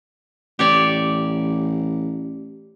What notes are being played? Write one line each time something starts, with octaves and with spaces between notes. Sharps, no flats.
A1 G4 C#5 D5